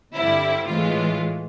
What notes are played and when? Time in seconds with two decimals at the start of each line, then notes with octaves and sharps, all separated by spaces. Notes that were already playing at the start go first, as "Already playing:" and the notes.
0.15 G2 D3 G3 C4 E4
0.67 A2 E3 G#3 F4